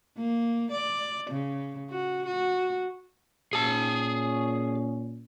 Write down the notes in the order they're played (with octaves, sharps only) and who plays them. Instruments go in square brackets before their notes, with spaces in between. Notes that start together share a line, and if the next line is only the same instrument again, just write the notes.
[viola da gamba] A#3
D5
C#3
F#4
F#4
[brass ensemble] A#2 C#4 [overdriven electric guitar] G#4 A5